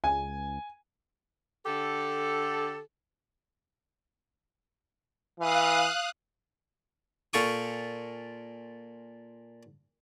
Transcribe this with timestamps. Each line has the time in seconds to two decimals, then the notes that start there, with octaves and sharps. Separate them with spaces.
0.04 C#2 G#5
1.66 D3 G4 A4
5.39 E3 F5 D#6 F#6
7.33 A#2 A4 F5 G5 C#6 D#6